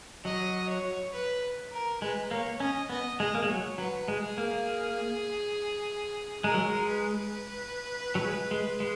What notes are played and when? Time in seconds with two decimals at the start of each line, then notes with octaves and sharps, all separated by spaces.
0.25 F#3 D#5
0.69 C#5
1.13 B4
1.72 A#4
2.01 G#3 B4
2.31 A#3 C#5
2.60 C#4 D#5
2.90 B3 D#5
3.20 G#3 D#5
3.35 A#3
3.42 G#3
3.49 F#3 C#5
3.78 F#3 B4
4.08 G#3
4.22 G#4
4.38 A#3
6.44 G#3 A#4
6.54 F#3
6.65 G#3
6.88 B4
8.15 F#3
8.21 G#3
8.51 G#3
8.80 G#3